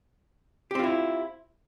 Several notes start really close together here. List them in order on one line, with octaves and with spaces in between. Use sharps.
G4 C4 F4 E4